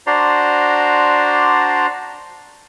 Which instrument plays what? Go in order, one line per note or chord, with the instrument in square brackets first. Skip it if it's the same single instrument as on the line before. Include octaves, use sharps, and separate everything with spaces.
[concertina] D4 F#4 C5 D5 A#5 C6